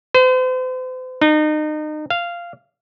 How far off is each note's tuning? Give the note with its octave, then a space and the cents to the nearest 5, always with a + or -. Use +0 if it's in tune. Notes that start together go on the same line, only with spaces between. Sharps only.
C5 -40
D#4 -30
F5 -10